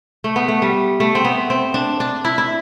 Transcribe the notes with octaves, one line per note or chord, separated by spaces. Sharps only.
A3
B3
A3
G3
A3
C4
B3
C4
D4
D4
E4
E4